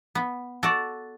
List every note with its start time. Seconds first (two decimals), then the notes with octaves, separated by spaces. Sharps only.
0.15 B3
0.63 F#4 A4 D5